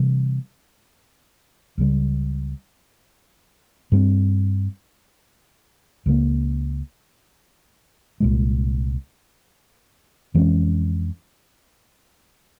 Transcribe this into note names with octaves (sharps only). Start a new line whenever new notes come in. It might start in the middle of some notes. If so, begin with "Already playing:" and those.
Already playing: C3 E3 G3
C#2 C#3 G3
G2 G3 C4
C#2 C#3 E3 A#3
C2 A#2 G#3
F2 E3 G#3 C#4